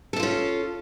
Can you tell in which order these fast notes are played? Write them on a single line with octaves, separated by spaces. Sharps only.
A4 D4 F4 C#4